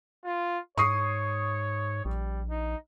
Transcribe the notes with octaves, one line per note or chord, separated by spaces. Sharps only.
F4
G#2 C#5 C#6 D#6 C7
A#1 G3
D#4